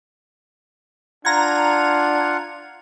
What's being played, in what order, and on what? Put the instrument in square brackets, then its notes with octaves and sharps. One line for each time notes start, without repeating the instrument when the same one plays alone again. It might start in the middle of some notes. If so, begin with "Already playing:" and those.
[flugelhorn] D4 [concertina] F4 F#5 [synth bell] A#5 G#6